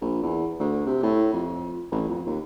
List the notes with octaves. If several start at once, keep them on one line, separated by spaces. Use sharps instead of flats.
A#1
E2
D2
C3
A2
F2
A1
F2
D#2